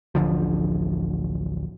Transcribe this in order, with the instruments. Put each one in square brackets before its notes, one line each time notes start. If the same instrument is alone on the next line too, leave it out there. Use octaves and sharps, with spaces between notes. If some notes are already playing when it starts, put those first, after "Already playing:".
[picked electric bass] D1 A1 D3 F3